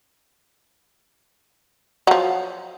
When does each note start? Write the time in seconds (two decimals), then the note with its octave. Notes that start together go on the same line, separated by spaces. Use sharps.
2.07 F3 F#3